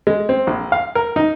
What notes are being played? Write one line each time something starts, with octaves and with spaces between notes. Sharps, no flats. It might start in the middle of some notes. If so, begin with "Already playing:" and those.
G#3
C4
A#1
F5
A#4
D#4